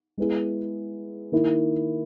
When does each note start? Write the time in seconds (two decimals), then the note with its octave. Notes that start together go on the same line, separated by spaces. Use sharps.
0.17 G#3 B3 E4 G#4
1.32 D#3 A#3 E4